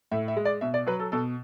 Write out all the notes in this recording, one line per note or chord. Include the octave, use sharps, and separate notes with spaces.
A2 E5
E5
G#3
D5
B2 E5
D5
F#3 B4
A4
B2 A4